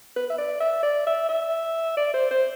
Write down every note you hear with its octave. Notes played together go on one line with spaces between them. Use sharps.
B4
E5
D5
E5
D5
E5
E5
D5
C5
C5